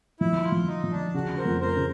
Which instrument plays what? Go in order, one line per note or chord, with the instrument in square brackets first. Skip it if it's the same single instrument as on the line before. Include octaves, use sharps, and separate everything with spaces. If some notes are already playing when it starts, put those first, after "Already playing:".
[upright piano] F3 [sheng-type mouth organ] E4
[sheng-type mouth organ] F4
[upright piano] F3
[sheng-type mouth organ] D#4
[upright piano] F3
[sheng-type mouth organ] D4
[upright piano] C#3 [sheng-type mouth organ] F#4
[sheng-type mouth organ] A#4 C5
[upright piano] F2
[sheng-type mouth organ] A#4 C5
[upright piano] C#3